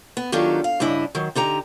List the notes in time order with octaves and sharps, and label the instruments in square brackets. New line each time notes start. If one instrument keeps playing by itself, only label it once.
[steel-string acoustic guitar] B3
D#3 F#3 D4 F4 G4 A4
F5
G2 C#3 D4 E4 D#5
D#3 F#3
D3 D#4 G4 A#5